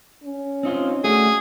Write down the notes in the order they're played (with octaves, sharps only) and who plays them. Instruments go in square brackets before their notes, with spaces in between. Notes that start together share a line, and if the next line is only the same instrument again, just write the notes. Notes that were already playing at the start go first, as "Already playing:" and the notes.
[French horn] C#4
[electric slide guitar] C4 D#4 F4
[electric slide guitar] A3 F#4 [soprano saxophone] G#4